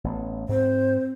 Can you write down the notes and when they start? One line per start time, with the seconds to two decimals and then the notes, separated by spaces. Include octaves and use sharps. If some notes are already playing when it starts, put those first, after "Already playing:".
0.04 A1 B3
0.49 G#2 C4 C5